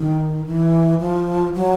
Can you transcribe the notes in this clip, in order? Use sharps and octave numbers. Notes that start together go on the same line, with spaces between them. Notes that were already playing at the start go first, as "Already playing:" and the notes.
Already playing: D#3
E3
F3
F#3